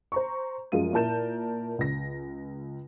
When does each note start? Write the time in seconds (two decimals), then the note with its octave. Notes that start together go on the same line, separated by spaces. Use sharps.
0.12 C5 A#5 C#6
0.72 F#2 F3 G#3 F5 D#7
0.93 A#2 E4 A#4 A5 G6 E7
1.79 C#2 A#6